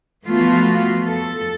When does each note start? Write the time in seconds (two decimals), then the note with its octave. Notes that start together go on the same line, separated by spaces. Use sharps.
0.25 E3 F3 A3 B3 F4 F#4
1.07 A4